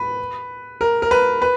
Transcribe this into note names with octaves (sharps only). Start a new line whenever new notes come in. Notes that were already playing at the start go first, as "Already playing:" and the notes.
Already playing: B4
A#4
A#4
B4
B4